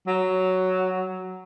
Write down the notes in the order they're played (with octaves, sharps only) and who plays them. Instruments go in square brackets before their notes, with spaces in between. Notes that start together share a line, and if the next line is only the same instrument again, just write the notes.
[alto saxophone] F#3